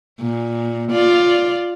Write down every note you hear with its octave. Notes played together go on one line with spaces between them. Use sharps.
A#2
F4 D5